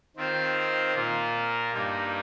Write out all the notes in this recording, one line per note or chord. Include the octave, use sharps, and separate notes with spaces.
D#3 C4 F4 C5
A#2 A#3 F4
G2 G3 A#3 D#4